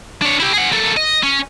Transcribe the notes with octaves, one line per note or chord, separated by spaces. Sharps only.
D4 C#5
E4 G4
G#4 F#5
A#3 A4
D#5
C#4